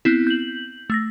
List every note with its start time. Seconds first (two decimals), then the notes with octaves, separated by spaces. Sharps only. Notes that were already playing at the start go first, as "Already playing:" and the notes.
0.05 B3 C4 E4
0.27 G6 F#7
0.90 A3 E6 A#6